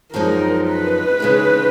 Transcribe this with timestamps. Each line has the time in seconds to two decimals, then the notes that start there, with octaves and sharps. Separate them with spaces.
0.13 F#2 F3 G#3 D#4 A#4
0.67 B4
1.20 C#3 G#3 D#4